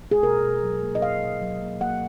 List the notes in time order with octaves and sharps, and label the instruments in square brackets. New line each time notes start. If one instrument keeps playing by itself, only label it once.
[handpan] G#4
B2 A#4
B2
F#3
A#3
D#5
B2 F5
B2
F#3
A#3
A#3 F#5